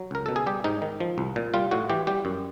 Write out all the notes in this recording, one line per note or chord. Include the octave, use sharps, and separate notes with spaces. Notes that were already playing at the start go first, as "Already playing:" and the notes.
Already playing: F#3
C#2 A#4
B2 A4
G#4
G3 G4
G#2 D#4
D#3
F3
C2
A#2
G3 F4
A2 F#4
E3 G4
G3 G4
F#2